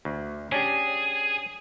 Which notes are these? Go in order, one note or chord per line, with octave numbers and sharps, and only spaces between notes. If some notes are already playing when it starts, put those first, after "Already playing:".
D2
C#4 D4 G4 G#4